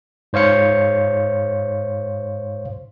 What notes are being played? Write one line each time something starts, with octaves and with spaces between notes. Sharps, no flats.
G#2 C5 C#5 F5 C#7